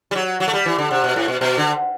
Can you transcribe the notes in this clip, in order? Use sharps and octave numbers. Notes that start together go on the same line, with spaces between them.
G3
F#3
F#3
A3
G3
E3
D3
C3
B2
A2
B2
B2
D3